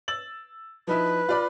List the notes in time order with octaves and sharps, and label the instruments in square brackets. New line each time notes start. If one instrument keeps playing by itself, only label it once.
[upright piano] E6 A6 F#7
[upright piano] F3 D#4 E4 [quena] B4
[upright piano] F4 D5 B5